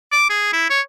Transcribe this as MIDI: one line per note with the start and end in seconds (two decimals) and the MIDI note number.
0.12 0.25 86
0.30 0.50 68
0.53 0.65 64
0.70 0.81 73